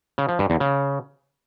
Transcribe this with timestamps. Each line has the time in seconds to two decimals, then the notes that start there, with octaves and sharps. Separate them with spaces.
0.18 C#3
0.29 F3
0.39 G2
0.50 E2
0.60 C#3